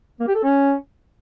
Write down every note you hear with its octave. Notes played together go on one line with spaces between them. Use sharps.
A#3
G4
A4
C#4